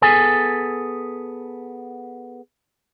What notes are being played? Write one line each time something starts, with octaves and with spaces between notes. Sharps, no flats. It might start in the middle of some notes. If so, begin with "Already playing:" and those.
B3 G#4 A4 G#5